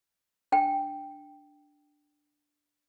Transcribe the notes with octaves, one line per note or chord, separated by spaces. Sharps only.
D4 G5